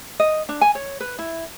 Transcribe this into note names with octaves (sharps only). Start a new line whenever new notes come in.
D#5
D4
G#5
C#5
B4
E4